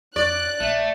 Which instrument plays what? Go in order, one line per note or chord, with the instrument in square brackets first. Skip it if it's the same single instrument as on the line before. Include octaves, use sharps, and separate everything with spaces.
[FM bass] F2 [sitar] D5 [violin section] F#6
[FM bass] A#1 [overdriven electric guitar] A3